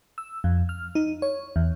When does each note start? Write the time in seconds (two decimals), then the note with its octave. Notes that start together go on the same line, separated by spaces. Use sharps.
0.18 E6
0.44 F2
0.69 F6
0.95 D#4
1.22 C#5
1.56 E2